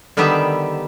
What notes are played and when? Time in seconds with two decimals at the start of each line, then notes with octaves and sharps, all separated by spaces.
0.17 D3 D#3 G3 B3 G4 E5